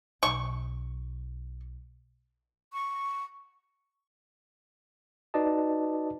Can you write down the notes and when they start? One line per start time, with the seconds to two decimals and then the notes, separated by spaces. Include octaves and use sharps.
0.23 B1 C#6
2.73 C#6
5.34 D#4 F#4 B4 D5 D#5 A5